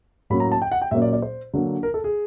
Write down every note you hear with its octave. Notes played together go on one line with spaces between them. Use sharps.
A2 F#3 A#3 C#4 B5
A#5
A5
G5
F#5
G5
A#2 F#3 A#3 C#4 E5
D5
D5
C5
D3 F#3 A#3
A#4
A4
G#4